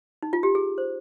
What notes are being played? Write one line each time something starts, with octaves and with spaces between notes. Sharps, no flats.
D#4
F4
G4
G#4
C5